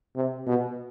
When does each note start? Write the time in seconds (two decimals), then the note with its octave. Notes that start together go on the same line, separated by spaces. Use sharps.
0.16 C3
0.47 B2